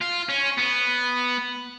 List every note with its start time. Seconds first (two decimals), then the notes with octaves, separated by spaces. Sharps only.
0.01 F4
0.29 C#4
0.58 B3